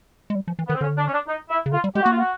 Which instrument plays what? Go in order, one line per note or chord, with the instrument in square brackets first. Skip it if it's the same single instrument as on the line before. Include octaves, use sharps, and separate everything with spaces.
[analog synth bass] G#3
G3
F3
E3
[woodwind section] B3
[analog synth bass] D#3
[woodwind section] C4
[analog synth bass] D3 [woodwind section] C#4
[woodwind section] D4
C#4
D4
D#4
E4
[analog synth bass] C#3
[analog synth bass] D3 [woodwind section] F4
[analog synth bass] G3
[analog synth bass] G#3 [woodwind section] G4
[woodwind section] F#4
[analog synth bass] A#3 [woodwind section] F4
[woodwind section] F#4